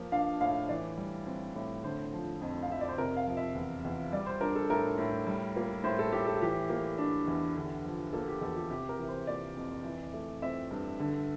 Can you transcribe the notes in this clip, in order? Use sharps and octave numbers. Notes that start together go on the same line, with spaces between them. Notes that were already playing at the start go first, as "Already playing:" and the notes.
Already playing: F3 A#3
D4 F5
A2 F5
E3 D5
G3
C4
A2
D3 C5
F3
F2
F5
F2 E5
D5
C5
C3 A#4
F5
F3
E5
E2
E2
G3 D5
C5
D4 A#4
A4
A2 A#4
A2
G3
A#3
A2 C5
A4
A2 G4
A4
E3 G4
A#3
D4
E2
D3
F3
A#3 A4
G4
E2 A4
G4
C3 G4
A#4
E3
C5
A#3 D5
F2
E3
A3
C4 E5
G2
D3